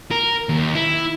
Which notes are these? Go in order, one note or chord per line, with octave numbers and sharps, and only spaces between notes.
A#4
D#2
E4